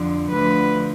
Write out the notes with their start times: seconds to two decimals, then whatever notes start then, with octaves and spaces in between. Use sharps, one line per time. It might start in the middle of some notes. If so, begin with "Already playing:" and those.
Already playing: F2 D3 F3
0.32 D2 D3 F3 B4